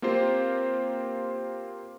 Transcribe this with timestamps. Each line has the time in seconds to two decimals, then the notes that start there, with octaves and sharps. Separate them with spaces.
0.02 A#3 C4 F4 G4 C5